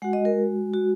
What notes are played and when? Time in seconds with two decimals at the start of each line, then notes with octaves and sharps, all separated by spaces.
0.02 G#3 F#4 F#5
0.13 D#5
0.25 A#4
0.74 F#4